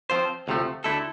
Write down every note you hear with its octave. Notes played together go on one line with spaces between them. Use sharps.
F3 C4 F4 C5
D2 C3 F3 A3
D2 D3 A3 E4 A4